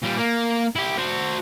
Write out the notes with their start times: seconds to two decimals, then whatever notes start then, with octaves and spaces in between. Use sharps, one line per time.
0.02 A#2 G3
0.18 A#3
0.76 E4 G4
0.99 F#4 C5